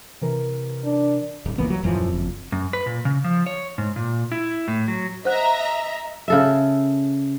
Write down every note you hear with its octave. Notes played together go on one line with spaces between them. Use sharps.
C3 E3 A#4
D4
D1
C#2 E3 A#3 B3
F#3
D#1 F#2 E3 F3
F#1 F2
F#2
B4
A#2
C#3
F3
C#5
G#2
A#2
E4
A2
F#3
C5 D#5 E5 F#5 A#5 F#6
C#3 A4 E5